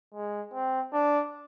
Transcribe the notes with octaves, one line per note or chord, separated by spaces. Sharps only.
G#3
C4
D4